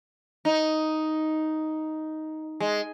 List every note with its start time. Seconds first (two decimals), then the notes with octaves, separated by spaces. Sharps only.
0.45 D#4
2.60 G#3